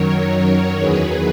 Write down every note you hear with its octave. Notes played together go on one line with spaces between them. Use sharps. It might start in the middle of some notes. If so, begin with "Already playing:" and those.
Already playing: F#2 D#3 F#3 A#4 C#5
E2 D#3 F#3 G#4 B4